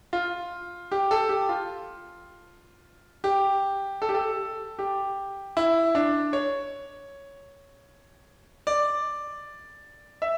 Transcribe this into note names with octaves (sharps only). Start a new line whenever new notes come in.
F4
G4
A4
G4
F4
G4
A4
G4
A4
G4
E4
D4
C#5
D5
E5